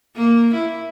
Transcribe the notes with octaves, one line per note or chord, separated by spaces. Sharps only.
A#3
E4